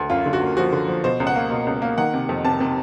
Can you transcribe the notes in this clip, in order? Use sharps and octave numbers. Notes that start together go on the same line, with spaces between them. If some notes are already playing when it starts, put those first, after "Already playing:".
Already playing: D2
F#2 F4
D3
F#4
A#3
F3 F#4
D3
F3
B2 C5
C#2
F#5
A#3
B2
C#2
A#3
D#3 F#5
C3
F2
C3 A5
C3